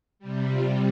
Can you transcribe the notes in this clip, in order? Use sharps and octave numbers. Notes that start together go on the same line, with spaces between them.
C3 G3
C3 G3 F4